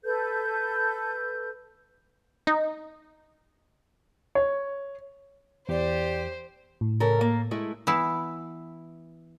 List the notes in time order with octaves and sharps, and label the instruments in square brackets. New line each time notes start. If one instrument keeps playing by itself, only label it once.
[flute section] A4 B4 G6
[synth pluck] D#4
[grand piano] C#5
[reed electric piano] E2 [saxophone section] G4 [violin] C5 [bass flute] D5
[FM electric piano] A2
[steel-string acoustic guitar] C#3 A4 A#4
A#3
G#3 A3 E4
[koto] E3 B3 E4